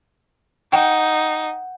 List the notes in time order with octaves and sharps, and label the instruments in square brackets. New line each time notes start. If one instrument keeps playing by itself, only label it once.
[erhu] D#4 [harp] F#5 G5